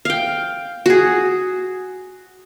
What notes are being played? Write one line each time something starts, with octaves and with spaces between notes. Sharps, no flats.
F5 G5
F#4 G#4